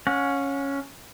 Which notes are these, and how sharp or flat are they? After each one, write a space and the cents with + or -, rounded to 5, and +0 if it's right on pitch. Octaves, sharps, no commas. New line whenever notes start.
C#4 +0 F#5 -45